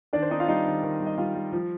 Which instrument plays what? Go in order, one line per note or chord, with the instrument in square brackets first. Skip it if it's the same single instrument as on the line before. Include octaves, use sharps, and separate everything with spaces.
[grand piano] D#3 D4 D5
C5
C4 D#4 D#5
F4 F5
G3 D#4 D#5
D#3
D#3
G3
D#5
G3 F4 F5
G3
F3